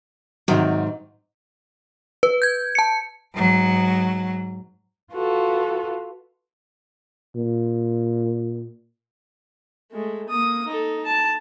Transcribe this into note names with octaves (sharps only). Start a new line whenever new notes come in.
G#2 C3 D#3 F#3
B4
G6 G#6
A5 C#7
G#2 F#3
F4 F#4 A4 B4
A#2
G#3 A3
A#3 D#6
D#4 A4
A5